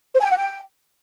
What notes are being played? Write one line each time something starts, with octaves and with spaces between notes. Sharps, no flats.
C5
G#5
G5
F#5
G5